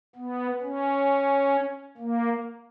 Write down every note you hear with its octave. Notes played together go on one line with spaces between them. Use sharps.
B3
C#4
A#3